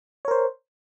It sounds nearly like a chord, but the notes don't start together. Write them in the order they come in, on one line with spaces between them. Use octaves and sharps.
C#5 A#4 C5